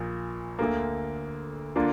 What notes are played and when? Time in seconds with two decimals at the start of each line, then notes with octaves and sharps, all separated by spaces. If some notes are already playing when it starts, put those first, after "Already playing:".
Already playing: A#1 A#2 A#3
0.59 D2 D3 A#3
1.76 D3 A#3 D4 F4